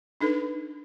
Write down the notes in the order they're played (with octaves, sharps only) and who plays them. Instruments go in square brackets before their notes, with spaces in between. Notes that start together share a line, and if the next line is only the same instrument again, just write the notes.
[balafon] D4 D#4 A4 B4